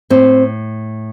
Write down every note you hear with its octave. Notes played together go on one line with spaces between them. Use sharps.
A2 C4